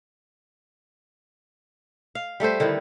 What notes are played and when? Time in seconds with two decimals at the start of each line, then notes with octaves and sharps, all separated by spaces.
2.15 F5
2.40 G3 A3 A4 C5
2.60 D3 D#3 B3 E4